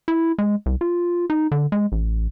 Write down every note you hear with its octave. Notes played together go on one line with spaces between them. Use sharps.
E4
G#3
C2
F4
D#4
D3
G#3
A1